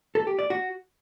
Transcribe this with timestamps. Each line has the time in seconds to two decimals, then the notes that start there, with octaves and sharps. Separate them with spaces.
0.15 A4
0.27 G4
0.39 D5
0.50 F#4